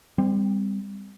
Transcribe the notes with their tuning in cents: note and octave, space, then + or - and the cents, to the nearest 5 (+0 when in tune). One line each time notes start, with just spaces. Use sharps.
G3 +25 C4 -20